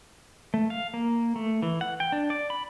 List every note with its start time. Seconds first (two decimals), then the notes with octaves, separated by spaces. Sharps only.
0.54 A3
0.70 F5
0.94 A#3
1.36 A3
1.62 E3
1.81 F#5
2.00 G5
2.12 D4
2.30 D5
2.50 B5